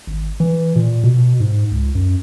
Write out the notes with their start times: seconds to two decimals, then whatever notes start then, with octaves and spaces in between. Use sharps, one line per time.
0.07 G#1
0.40 E3
0.76 A#2
1.04 B2
1.40 G#2
1.72 C#2
1.95 F#2